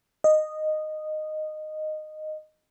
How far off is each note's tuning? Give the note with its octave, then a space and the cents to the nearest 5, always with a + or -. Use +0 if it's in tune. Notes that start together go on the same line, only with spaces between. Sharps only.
D#5 -10